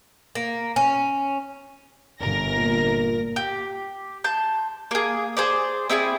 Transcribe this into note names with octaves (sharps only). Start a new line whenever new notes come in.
A#3
C#4
G1 A#4 A#6
A#2
G4
A5 C6 G6
A#3 G#4
G#4 C5 D5
C4 E4 G#4 D5